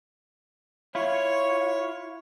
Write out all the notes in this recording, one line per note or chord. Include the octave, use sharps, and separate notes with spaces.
E4 F4 C#5